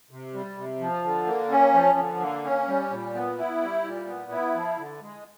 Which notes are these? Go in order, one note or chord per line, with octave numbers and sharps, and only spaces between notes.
C3
G3
C3
F3
D3
A#3
C#4
F3
D3
A#3
C#4
G3
A#2
B3
E4
G3
A#2
B3
E4
F3
D3
G#3